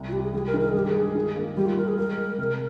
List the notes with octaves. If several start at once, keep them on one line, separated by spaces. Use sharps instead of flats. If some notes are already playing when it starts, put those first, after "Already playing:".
Already playing: C2
F4
C2 G4
G#4
G3 G#4
A#4
D#3
A#4
G#4
G2 G4
G#4
G#3
D#3
A#3
G3 G4
F4
G3 A#4
G#4
G#3 A#4
G#3
C3